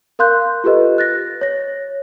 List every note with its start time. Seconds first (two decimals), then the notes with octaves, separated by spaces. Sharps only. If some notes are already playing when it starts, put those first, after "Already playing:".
0.19 A#4 F5 C6 F#6 G6
0.64 F4 G4 A4 B4 D#5
0.98 F#6 A6 A#6
1.41 C#5 A#6